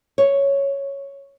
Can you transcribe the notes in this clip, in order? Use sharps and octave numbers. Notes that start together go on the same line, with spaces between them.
C#5